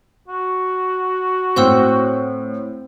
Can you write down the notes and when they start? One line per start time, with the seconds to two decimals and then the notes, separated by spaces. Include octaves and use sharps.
0.28 F#4
1.56 A2 C4 F#5 C6 E6